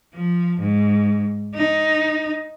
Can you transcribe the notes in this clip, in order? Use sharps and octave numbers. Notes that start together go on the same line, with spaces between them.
F3
G#2
D#4